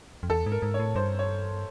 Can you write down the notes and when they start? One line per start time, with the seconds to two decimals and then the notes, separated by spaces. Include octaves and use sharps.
0.23 F2
0.30 E2 A4
0.46 G#2
0.52 A#4
0.62 G#2
0.74 C#5
0.80 A2
0.96 G2 C5
1.19 C#5